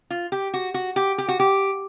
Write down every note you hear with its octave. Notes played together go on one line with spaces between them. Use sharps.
F4
G4
F#4
F#4
G4
G4
F#4
G4